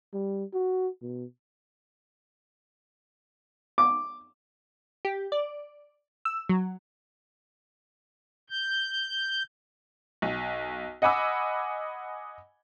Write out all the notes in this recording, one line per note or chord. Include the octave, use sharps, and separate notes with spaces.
G3
F#4
B2
D6
G4
D5
E6
F#3
G6
B1
D#5 F#5 G#5 B5 D6 E6